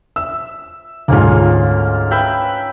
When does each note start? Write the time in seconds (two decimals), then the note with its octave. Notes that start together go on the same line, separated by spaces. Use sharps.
0.16 E5 E6
1.08 D2 G#2 A#3 C#4 F4
2.11 B4 E5 G5